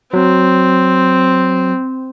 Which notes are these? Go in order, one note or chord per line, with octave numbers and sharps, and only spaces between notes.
F#3 C4